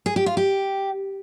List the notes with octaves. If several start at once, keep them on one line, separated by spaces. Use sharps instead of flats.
G#4
G4
F4
G4